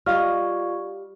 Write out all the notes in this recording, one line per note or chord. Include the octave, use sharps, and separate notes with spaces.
G3 F4 D5 D#5 F5 C#6 F6